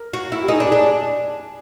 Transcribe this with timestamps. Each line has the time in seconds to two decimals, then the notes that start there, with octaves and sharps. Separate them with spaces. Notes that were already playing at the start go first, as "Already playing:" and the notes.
Already playing: A#4
0.13 F#4
0.32 E4
0.42 G4
0.48 D#4 G#4
0.60 D4
0.66 G#4
0.72 D4